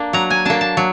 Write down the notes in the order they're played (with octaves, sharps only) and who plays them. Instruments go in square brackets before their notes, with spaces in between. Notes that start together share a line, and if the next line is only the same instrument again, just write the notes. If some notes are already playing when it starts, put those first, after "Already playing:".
Already playing: [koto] A#3 D4
F#3 A#5
G#5
A#3 D4 A5
A5
F#3